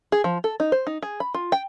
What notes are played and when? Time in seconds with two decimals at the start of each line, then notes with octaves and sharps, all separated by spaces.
0.12 G#4
0.24 F3
0.44 A4
0.60 D#4
0.72 C5
0.87 D#4
1.02 G#4
1.20 B5
1.34 F4
1.52 G5